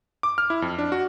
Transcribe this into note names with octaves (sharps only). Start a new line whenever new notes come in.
D6
F6
E4
F2
D4
F#4